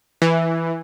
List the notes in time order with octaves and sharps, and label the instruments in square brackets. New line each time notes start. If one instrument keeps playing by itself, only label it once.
[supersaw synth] E3